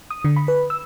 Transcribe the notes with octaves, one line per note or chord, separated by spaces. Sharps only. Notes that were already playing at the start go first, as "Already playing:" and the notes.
D#6
D3
B5
B4
E6